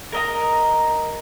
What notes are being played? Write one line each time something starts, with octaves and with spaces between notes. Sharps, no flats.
A#4 D#5 A#5